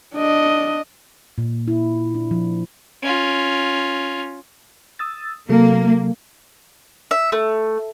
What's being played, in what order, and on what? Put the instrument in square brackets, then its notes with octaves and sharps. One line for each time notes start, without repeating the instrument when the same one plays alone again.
[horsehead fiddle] D4 D#5
[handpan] A#2
E4
D4
F3
[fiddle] C#4 F4
[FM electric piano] D#6 E6 A6
[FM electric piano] C3 F#3 A4 [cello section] A#3
[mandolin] E5
A3